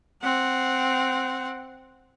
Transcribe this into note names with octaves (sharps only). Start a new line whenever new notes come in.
C4 F#5